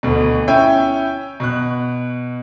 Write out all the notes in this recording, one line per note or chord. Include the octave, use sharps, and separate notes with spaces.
D2 B2
C#4 E4 C#5 E5 G5 G#5
B2 F#6